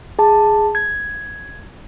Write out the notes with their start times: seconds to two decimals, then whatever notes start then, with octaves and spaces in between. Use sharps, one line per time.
0.19 G#4 A5
0.75 G#6